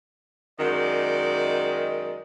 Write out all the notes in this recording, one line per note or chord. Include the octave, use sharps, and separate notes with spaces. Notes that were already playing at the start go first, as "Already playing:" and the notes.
F#2 D#3 G#3 D5